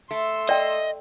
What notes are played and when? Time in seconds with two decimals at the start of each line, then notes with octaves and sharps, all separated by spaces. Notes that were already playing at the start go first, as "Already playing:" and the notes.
0.11 A3 C6 E6
0.49 D5 D#5 G5